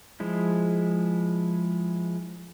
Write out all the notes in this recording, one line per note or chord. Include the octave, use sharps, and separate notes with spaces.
F3 G#3 E4